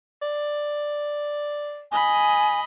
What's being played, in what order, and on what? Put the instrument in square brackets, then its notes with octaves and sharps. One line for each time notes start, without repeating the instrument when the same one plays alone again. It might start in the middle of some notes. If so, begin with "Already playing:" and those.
[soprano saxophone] D5
[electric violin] D#5 B5 [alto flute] G#5